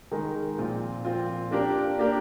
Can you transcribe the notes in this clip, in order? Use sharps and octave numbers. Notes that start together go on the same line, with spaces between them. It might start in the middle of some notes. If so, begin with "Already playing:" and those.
D#3 G#3 D#4 A#4
A#2 F3 C4 F4
A#2 F3 C4 F4
A#3 D4 G4 A#4
A#3 D4 G4 A#4